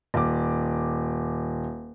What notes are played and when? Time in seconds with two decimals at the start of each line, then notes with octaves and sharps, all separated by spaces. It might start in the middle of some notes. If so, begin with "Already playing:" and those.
0.14 D#1 D6